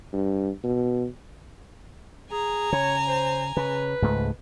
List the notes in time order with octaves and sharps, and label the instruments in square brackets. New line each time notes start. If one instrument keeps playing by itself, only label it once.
[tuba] G2
B2
[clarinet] G#4 [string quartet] G#5 A#5
[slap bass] C#3 [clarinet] C#5
[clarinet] C5
[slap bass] C#3 [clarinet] B4
[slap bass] C#2 G#2 A3